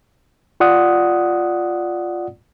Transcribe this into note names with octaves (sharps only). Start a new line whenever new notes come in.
F4 D5 F#5 D#6